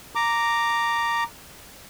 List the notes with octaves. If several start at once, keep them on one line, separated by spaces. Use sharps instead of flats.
A#5 D6